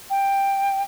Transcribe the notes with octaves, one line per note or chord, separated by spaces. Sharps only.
G5